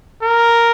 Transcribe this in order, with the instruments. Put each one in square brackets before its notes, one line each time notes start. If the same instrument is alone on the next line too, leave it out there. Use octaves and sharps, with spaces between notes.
[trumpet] A#4